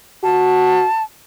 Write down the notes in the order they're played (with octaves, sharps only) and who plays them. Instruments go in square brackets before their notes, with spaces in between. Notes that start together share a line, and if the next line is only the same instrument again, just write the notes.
[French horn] F#4 [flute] A5